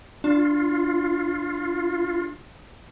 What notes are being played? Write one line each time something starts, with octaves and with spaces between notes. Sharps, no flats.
D4 F4